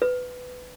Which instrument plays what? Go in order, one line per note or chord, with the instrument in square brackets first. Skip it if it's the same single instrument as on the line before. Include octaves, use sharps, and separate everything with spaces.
[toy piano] B4